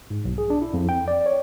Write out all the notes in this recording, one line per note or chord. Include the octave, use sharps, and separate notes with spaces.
G#2
B1
G#4
D4
E4
F2
G5
D5
C#5